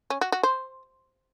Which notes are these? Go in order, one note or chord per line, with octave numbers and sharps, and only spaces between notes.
C#4
F#4
F#4
C5